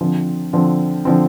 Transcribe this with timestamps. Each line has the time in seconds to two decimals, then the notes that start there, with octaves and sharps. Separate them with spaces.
0.01 D3 F3 C4
0.53 D3 F3 C4
1.05 D3 F3 C4